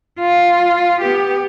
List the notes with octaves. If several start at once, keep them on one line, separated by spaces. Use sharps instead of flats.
F4
B3 G4